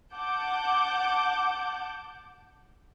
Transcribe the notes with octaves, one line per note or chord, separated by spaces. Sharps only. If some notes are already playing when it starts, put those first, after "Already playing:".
F#5 A5 D6 G6